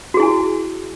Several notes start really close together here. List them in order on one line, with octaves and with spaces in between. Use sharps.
F#4 G#4 E4 G#5